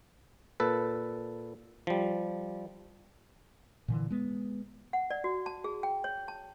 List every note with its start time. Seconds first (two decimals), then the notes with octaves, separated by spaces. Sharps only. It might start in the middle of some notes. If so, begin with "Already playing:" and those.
0.60 A#2 A4 B4
1.87 F3 G3
3.88 A#2 D3 E3
4.10 G#3 B3
4.93 F#5
5.10 D5
5.24 F#4
5.46 A5
5.64 G#4
5.83 G5
6.04 C#5
6.28 A5